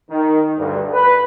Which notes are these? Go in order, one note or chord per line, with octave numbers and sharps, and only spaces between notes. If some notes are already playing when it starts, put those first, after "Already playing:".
D#3
D2 G2
B4